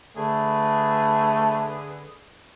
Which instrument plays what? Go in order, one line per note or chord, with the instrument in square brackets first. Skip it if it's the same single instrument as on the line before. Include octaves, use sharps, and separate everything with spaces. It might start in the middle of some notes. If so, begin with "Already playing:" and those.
[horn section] D3 G#4 B4 [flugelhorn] A3